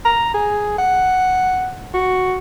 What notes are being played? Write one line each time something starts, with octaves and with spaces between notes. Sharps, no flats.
A#5
G#4
F#5
F#4